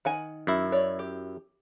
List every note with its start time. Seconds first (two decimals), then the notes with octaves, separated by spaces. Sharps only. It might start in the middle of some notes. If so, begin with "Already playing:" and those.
0.05 D#3 F#5 G#5
0.47 F#2 E4
0.72 C#5 D5
0.99 G4